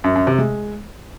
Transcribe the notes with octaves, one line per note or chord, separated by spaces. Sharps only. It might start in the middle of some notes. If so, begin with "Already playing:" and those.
F#2
F#2
C3
G#3